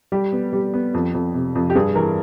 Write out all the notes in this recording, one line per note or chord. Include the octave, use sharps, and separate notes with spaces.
G3 G4
B3
G3
B3
F2
F2
C3
F2
G4
G2 G#4
E3 A#4